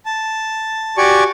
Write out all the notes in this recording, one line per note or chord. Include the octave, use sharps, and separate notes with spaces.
A5
F#4 G4 D5 G#5 C#6